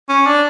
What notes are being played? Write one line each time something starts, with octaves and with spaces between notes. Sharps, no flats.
C#4
D4